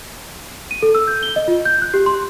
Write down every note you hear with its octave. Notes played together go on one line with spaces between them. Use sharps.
D#7
A4
E6
G6
G7
D#5
F4
G6
F#6
G4
C6